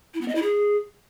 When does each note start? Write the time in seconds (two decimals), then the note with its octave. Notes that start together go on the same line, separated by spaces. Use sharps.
0.14 E4
0.21 B3
0.28 D#5
0.35 E4
0.42 G#4